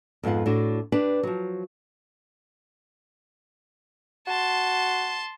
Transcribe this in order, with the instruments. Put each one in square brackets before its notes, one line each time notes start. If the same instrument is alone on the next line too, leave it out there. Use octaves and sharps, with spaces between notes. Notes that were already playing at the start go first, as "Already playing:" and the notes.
[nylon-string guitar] F2 G#2 B3 F4 F#5
A2 D4 F#4
D4 G4 B4
F3 F#3
[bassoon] F#4 [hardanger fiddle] A5 C6